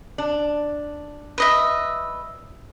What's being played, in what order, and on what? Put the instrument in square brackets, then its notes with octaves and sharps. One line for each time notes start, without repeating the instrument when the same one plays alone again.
[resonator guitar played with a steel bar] D4
[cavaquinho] B4 D#5 E5